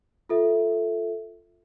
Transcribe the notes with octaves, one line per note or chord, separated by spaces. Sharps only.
F4 A4 E5